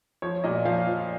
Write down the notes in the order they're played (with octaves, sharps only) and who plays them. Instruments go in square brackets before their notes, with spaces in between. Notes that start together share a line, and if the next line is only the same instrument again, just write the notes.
[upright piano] F3 C#5
A#2 D#5
F3 F5
F3